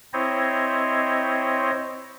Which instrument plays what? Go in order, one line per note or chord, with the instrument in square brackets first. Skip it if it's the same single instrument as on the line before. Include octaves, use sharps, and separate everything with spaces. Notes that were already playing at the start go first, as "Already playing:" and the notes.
[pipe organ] C4 E4 C5 C#5 D#5